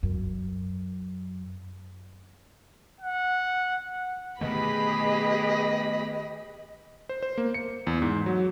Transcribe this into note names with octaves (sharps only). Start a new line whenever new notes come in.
F#2
F#5
B2 D#3 A3 G4 G#4 B4 D#5 B5
C5
C5
A#3
C#7
E2
G#2
F#3